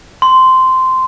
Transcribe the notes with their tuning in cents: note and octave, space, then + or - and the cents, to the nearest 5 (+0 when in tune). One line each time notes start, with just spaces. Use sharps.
C6 -10